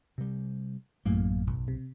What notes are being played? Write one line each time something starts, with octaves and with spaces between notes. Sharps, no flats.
C3 G3
A1 F#2 A2 A#3
B1
C3